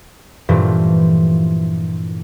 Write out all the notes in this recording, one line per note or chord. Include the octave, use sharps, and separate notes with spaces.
G2 A#2 E3 F3 A3